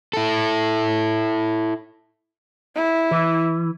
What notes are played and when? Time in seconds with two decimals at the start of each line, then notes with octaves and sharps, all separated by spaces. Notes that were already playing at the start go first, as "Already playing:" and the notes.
0.13 E4 A4
2.76 E4
3.11 E3